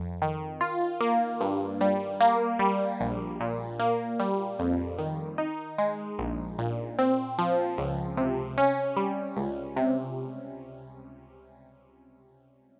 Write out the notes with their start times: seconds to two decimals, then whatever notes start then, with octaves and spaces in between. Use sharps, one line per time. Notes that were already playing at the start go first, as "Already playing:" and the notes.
Already playing: F2
0.22 D#3
0.61 F4
1.01 A#3
1.41 G2
1.81 G3
2.21 A#3
2.59 G3
3.00 A#1
3.40 A#2
3.79 A#3
4.20 G3
4.59 F2
4.98 D#3
5.38 D#4
5.78 G#3
6.19 A#1
6.59 A#2
6.99 C4
7.38 F3
7.78 C#2
8.17 C3
8.58 C#4
8.97 G3
9.37 C#2
9.76 C3